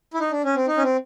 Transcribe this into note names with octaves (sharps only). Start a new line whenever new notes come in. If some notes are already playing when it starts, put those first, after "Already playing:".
E4
D#4
D4
C#4
C4
D#4
C#4
C4